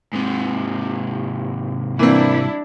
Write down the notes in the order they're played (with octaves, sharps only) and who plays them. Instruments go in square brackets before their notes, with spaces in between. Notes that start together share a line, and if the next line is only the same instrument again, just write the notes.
[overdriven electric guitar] G#2 C3
[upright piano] E3 A#3 C4 [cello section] G3 D4 E4